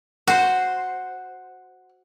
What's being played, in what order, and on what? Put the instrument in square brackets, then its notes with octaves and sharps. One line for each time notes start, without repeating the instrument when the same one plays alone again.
[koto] F#4 C5 [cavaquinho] F#5